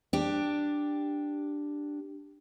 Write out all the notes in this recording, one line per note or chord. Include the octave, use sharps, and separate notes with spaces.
D4 G4